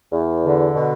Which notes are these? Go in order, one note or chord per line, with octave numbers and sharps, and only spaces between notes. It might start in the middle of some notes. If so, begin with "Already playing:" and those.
E2
D3
B2